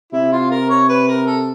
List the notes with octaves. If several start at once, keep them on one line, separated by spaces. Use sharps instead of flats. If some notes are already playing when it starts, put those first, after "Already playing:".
C3 E4
F4
A#4
C#5
B4
A#4
A4